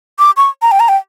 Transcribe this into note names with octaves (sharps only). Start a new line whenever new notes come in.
D6
C#6
A#5
G5
A#5
G5